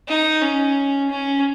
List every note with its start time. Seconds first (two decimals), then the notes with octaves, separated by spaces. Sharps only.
0.08 D#4
0.42 C#4
1.10 C#4